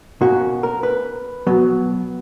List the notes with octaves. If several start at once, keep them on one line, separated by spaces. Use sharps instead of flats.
B2 A#3 C#4 F#4
A#4
B4
B2 F#3 B3